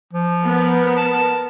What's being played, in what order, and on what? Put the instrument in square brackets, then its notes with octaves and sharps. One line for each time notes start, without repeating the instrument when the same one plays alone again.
[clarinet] F3
[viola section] B3 A#4
[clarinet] A5